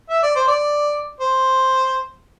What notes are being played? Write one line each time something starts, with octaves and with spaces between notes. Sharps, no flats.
E5
D5
C5
D5
C5